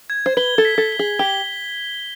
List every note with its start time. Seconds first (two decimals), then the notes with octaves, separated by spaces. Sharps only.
0.10 G#6
0.26 C5
0.37 B4 G7
0.58 A4
0.65 B6
0.78 A4
0.92 G7
0.99 G#4
1.19 G4 G7